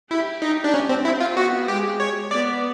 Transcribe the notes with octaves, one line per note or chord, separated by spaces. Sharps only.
E4 G4
D#4
D4
C#4
C4
C4 E4
F4
B3 F#4
G#3 G4
C#5
B3 D5